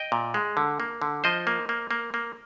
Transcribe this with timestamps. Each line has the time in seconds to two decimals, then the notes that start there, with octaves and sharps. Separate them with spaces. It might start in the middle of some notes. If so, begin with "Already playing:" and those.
Already playing: D#5 G5
0.12 A#2
0.34 G#3
0.57 D3
0.80 A#3
1.02 D3
1.24 F3 C5 D#5
1.47 A#3
1.69 A#3
1.91 A#3
2.14 A#3